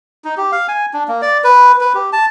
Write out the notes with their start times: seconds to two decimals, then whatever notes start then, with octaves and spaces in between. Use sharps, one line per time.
0.24 D#4
0.37 G4
0.52 F5
0.68 G#5
0.93 D4
1.08 A#3
1.22 D5
1.44 B4
1.81 B4
1.95 G4
2.13 A5